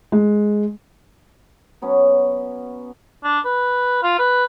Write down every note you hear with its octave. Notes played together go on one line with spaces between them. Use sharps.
G#3
F#3 B3 C#4
D4
B4
F4
B4